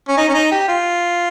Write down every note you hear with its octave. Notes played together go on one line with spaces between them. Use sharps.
C#4
D#4
C#4
D#4
G4
F4